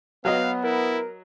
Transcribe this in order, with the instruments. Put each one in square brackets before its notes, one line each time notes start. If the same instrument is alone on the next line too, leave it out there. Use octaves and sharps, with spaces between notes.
[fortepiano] F#3 F#4 D#5 [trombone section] B3 [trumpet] F5
[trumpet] E4 [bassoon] A#4